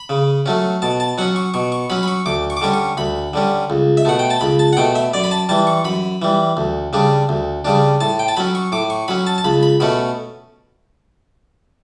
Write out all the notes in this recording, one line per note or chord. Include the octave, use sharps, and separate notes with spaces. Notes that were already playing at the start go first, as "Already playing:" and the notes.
Already playing: B5
C#3
F#3 A3 C#4
B2 A5
A5
F#3 C#4 F#5
C#6
B2 C#6
C#6
F#3 C#4 B5
B5
C#6
D2 D6
C#6
D6
D3 G3 C#4 C#6
C#6
D2 B5
D3 G3 C#4
C#2
E5
B2 A3 F#5
G5
A5
C#2 B5
A5
F#5
B2 A3 G5
E5
F#2 D5
B5
A5
E3 G3 A5
C#6
F#2 B5
E3 G3
D2
C#3 G3 D4
D2
C#3 G3 D4
A2 A5
G5
A5
F#3 C#4 B5
C#6
A2 D6
C#6
F#3 C#4 B5
A5
A5
C#2 B5
B5
B2 A3 C#4 B5